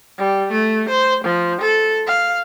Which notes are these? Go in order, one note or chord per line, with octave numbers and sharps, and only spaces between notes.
G3
A3
C5
F3
A4
F5